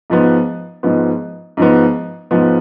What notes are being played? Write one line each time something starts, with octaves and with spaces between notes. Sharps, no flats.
G#2 F3 B3
G#2 F3 B3
G#2 F3 B3
G#2 F3 B3